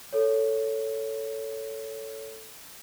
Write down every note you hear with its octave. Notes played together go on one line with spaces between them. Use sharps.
A4 C#5